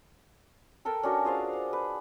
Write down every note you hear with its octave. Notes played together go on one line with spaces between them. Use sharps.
A4 A#4 G5 A5
C#4 D4 F#4 A#4
F4 G#4 C5 F5
F#5
B4